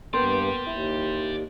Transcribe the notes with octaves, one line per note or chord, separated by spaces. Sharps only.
G2 A#3 B3 D5 G5 C6
D#2 E4